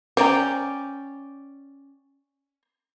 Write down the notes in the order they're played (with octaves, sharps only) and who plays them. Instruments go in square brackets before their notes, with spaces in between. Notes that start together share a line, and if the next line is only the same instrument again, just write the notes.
[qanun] C#4 D5 G5 [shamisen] C5 A#5